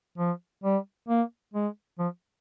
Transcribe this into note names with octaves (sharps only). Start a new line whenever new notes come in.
F3
G3
A#3
G#3
F3